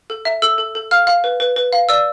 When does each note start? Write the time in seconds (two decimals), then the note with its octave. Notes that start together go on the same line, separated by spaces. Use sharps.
0.10 A4
0.25 E5
0.42 A4 E6
0.58 A4
0.75 A4
0.91 F5 F6
1.07 F5
1.24 B4
1.40 B4
1.56 B4
1.73 F5
1.89 D5 E6